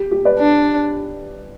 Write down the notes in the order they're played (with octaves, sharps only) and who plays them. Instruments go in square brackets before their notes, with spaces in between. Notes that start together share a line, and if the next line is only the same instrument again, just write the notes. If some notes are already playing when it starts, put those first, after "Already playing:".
Already playing: [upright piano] G4
G4
B4 D5
[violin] D4